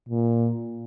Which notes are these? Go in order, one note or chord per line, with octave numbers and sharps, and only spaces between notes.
A#2